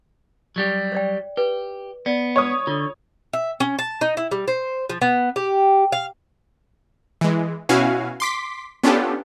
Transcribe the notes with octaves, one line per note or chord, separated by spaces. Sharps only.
F#3 G3 G4
C#5 D5 G5
G4 B4
B3 D5
C#5 C#6 D#6
D3 F4
E5
C#4
A5
D#4
E4
G3
C5
F3
B3
G4
F5
E3 G#3
B2 C#4 E4 F#4 F5 G#5
C6 D6 B6
B3 C#4 D4 F4 G4 A4